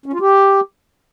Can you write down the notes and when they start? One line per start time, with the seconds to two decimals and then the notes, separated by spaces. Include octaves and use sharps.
0.06 C#4
0.13 F4
0.20 G4